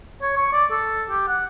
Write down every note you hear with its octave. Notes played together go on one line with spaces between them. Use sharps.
C#5
C#6
D5
A4
G4
F#5